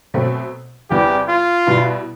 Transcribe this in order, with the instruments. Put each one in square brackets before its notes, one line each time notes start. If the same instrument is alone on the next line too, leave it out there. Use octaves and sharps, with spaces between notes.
[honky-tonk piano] B2 F#3 A3 C4
[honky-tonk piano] E2 C3 E3 G3 B3 [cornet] G4
[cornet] F4
[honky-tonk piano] B2 G3 B3 E4